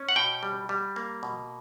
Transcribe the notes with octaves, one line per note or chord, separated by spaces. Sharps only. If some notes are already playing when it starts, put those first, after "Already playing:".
Already playing: C#4
F#5
B2 G5
G3
G3
A#3
B2